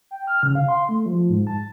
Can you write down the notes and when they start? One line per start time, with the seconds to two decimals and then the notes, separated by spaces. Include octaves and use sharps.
0.11 G5
0.27 F6
0.43 C#3
0.55 F5
0.68 C6
0.89 A3
1.06 F3
1.30 G#2
1.47 A5